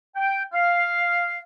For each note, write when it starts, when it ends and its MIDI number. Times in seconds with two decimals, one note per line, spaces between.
0.15 0.42 79
0.53 1.39 77